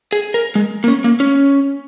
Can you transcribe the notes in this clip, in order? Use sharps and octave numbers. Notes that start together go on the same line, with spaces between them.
G#4
A#4
G#3
A#3
C#4
A#3
C#4